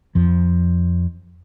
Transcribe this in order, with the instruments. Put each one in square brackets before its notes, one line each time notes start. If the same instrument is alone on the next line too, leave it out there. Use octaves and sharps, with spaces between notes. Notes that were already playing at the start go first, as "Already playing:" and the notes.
[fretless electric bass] F2 F3